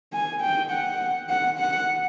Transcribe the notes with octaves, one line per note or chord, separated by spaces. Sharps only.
G#5
G5
F#5
F#5
F#5